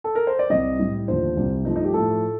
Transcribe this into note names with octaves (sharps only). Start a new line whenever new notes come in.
A4
A#4
C5
D5
C2 C3 G3 D#5
A2 G3
D#2 D3 F3 A3 C5
C2 C3 G3
G2 F3 A3 D#4
D#4
G4
A2 F3 A3 A4